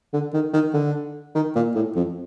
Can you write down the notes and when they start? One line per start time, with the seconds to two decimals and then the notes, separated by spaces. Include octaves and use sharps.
0.13 D3
0.34 D#3
0.53 D#3
0.73 D3
1.35 D#3
1.55 A#2
1.75 A2
1.96 F2